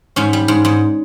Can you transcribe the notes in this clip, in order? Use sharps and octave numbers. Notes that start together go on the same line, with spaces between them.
G#2 C#4
G3
G#2
G#2